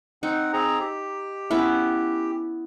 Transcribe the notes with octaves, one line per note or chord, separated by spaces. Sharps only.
C4 D#4 F#5
C4 G#4 A#5
G4
B3 C#4 E4